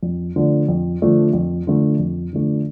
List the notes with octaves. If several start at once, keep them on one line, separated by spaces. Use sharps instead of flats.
F2
D3 F3 A3 D4
F2
D3 F3 A3 D4
F2
D3 F3 A3 D4
F2
D3 F3 A3 D4